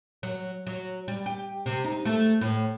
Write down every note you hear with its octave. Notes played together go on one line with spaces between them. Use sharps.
F#3
F#3
G3
G4
C3
D#4
A3
A2